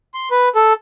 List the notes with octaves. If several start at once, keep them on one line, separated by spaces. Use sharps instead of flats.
C6
B4
A4